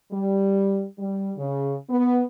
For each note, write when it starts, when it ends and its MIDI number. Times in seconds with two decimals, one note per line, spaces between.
0.12 0.86 55
0.99 1.31 55
1.37 1.74 49
1.90 2.23 59